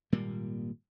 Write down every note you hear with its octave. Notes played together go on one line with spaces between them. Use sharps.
G#1 A#2 G3 A#3